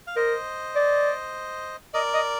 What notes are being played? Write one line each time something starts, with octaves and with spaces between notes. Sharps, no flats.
F5
A#4 C5 D#5
D5
A#4 D5 D#5
D#5